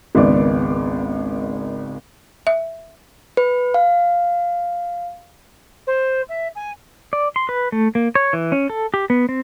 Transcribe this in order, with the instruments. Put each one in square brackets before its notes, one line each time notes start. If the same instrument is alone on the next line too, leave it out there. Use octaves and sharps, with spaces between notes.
[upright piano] G#1 C#2 D#3 B3 D5 D6
[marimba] E5
[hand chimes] B4
F5
[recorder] C5
E5
G#5
[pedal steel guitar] D5
C6
B4
A3
A#3
C#5
E3
C#4
A4
G4
B3
C4